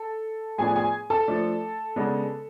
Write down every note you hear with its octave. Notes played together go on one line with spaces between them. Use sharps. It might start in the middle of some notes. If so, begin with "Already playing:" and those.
Already playing: A4
A2 F3 B3 D4 G#4 G#5
G#4 G#5
A4 A5
F3 A3 D4
C#3 G#3 B3 D4